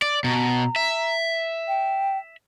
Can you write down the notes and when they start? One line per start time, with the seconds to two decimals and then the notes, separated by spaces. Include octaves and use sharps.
0.02 D5
0.24 B2 A#5
0.76 E5
1.68 G5